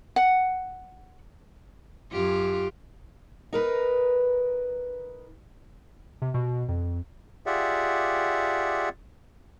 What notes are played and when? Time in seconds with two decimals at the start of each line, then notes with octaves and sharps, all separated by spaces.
0.16 F#5
2.12 F#2 F4 G4
3.53 D#4 A#4 B4
6.22 C3
6.34 B2
6.68 F2
7.46 F4 G4 G#4 D5 E5 F#5